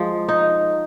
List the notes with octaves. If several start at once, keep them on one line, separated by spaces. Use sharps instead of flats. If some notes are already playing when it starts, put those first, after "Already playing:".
Already playing: F3 G#3
D#4